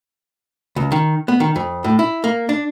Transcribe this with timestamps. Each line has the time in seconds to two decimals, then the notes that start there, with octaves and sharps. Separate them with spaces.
0.76 C#2
0.92 D#3
1.28 B3
1.40 D#3
1.56 F2
1.84 A2
1.99 E4
2.24 A#3
2.49 D4